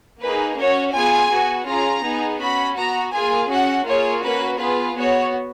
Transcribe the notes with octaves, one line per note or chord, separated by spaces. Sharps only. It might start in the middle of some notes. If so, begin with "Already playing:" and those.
A#3 D#4 G#4 B4
C#4 F#4 C#5
B3 F4 G#4 G#5
B3 F#4
C#4 F4 G#4 A#5
B3 D#4 G#4
C#4 F#4 B5
B3 F#4 A#5
A#3 F4 G#4 G#5
C#4 F#4 F#5
A#3 F4 G#4 C#5
A#3 C#4 F#4 B4
B3 F4 G#4 B4
B3 F#4 C#5